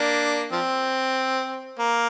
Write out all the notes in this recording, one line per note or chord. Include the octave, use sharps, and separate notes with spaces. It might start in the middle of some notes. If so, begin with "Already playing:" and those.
Already playing: A#3 D4
F3 C4
A#3